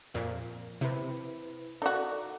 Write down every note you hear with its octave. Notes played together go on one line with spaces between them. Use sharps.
F2 A#2
C3 E4 B4
D#4 F#4 A4 D5